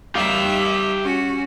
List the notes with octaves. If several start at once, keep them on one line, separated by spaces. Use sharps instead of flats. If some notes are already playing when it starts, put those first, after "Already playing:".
G3 G4 E5 F5
C#4 F#4